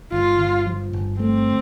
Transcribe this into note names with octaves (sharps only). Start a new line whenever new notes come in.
G1 F4
G1
F3
G1
A3 C4